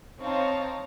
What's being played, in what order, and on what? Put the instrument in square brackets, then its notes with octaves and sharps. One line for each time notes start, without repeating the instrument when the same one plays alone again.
[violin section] C4 D#4 C#5 F5 A5 A#5